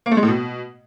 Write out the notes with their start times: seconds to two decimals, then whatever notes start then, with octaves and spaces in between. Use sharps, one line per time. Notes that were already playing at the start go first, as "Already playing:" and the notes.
0.06 A#3
0.11 A3
0.17 G#3
0.23 A2
0.28 B2